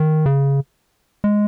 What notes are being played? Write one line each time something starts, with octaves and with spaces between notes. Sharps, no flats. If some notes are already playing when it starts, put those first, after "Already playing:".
Already playing: D#3
C#3
G#3